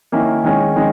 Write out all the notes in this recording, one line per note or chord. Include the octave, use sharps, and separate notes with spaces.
D#3 A#3 C#4 E4
D#3 G#3 C#4
D#3 G#3 C#4